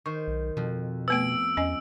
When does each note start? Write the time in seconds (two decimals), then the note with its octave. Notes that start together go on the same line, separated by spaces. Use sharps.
0.06 D#3 C5 C#6
0.28 B1
0.57 F2 B2
1.08 A3 B3 B4 E6 D7
1.57 E2 C#4 D#5 G#5